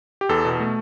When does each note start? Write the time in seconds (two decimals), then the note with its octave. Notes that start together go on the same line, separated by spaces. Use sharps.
0.21 G4
0.29 E2 A4
0.45 B2
0.60 A3